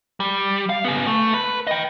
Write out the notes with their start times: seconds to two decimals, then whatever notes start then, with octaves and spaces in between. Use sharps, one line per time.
0.20 G3
0.69 F5
0.84 C#3 B3
1.07 A3
1.34 B4
1.67 D#5 G5